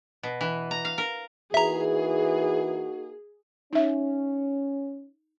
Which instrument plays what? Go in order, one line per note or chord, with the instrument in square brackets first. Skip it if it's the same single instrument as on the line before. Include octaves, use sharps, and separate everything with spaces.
[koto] B2
E3
A#5
F5
A#4
[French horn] E3 [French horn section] A#3 D#4 F#4 [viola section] G#4 [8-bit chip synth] E5 A#5
[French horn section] C#4 [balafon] D#4 E5